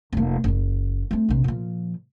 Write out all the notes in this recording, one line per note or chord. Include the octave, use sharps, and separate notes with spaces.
F1 A#3
F#1 C#3
A3 C4
A#1 C3
A#2 F3